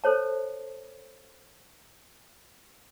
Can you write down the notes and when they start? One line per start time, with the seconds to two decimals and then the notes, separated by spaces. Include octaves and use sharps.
0.04 A4 C5 C#5 A5